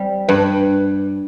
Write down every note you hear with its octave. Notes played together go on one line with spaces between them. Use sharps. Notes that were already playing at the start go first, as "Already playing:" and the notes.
Already playing: G3 C4
G2 B4